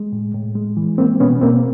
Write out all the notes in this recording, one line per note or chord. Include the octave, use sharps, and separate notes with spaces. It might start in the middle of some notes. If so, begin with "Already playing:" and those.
Already playing: G#3
A2
A2
G#3
E3
G#3 A#3 C4
B2 B3 C#4
B2 A#3 C4